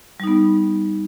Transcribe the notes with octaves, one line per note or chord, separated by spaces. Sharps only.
G3 B3 D#4